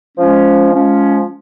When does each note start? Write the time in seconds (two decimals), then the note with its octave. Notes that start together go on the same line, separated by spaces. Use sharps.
0.17 F3 G#3 C#4
0.73 F3 G#3 C#4